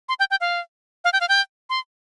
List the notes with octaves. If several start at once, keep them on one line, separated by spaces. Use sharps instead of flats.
C6
G5
G5
F5
F5
G5
F5
G5
C6